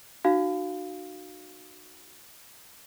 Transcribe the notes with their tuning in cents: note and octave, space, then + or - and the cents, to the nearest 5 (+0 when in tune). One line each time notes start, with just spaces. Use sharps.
D#4 -40 F#4 +0 F5 +0